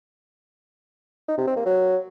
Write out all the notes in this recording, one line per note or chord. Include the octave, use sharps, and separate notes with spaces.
D#4
C3
C4
A#3
F#3